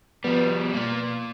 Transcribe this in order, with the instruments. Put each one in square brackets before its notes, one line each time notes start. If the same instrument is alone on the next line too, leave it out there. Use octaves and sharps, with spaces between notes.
[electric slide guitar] F3 G3 [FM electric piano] B3
[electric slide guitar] A#3 D5